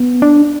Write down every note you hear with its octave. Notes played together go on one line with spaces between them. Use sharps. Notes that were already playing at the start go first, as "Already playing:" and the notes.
Already playing: B3
D4